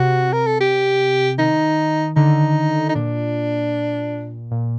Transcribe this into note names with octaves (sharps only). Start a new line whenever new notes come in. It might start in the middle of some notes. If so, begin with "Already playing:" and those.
Already playing: C3 F#4
A#4
A4
G4
D#3 D#4
D3 D#4
D#4
A#2 D4
A#2